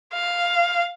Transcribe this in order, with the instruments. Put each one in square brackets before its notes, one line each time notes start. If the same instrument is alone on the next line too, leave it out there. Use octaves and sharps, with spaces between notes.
[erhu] F5